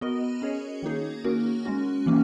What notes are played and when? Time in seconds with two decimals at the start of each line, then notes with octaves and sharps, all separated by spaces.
0.01 B3 F#4 A#4 D#5
0.42 C#4 G#4 C#5
0.83 D#3 A#3 D#4 G#4
1.24 A#3 C#4 F#4 A#4
1.65 G#3 C#4 F#4
2.06 E3 A#3 C#4